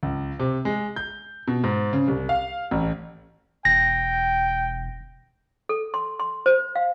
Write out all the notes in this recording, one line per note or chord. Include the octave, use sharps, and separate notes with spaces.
C#2
C3
G#3
G6
B2
G#2
C#3
C2
F5
A1
E1 G5 A#6
A4
C6
C6
C5
F5